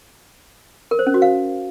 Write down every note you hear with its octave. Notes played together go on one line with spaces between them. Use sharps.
A#4
C5
C#4
F#4
F5